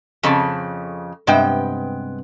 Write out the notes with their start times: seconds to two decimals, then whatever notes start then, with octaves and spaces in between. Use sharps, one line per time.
0.23 F2 C#3 A4 A5
1.27 G2 C3 G#3 B3 G5